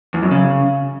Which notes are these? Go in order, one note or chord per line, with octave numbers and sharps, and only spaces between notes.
E2
F#2
C#3